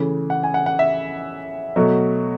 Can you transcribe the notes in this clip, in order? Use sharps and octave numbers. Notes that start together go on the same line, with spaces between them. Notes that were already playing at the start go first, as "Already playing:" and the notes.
Already playing: C#3 E3 A3
F#5
G#5
F#5
F#5
E5
B2 F#3 A3